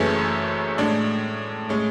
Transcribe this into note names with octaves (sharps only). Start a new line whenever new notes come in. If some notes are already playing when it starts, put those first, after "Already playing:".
Already playing: F#1 F#2 E3 A3 C#4 G#4
A2 G#3 D4
A2 G#3 C#4